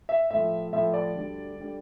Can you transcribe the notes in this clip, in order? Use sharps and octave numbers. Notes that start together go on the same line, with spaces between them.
E5
A2 F3 E5
A2 F3 E5
D5
D2 D3 G3
D3 G3